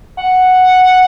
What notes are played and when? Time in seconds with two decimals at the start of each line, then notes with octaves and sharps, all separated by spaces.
0.19 F#5